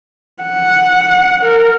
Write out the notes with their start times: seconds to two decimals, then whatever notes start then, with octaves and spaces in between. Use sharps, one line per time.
0.43 F#5
1.44 A#4